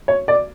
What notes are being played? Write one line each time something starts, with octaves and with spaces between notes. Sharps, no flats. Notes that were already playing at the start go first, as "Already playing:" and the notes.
C#5
D5